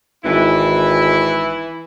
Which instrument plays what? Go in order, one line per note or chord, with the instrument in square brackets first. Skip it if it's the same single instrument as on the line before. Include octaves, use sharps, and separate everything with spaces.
[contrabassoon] G#1 [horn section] E3 E4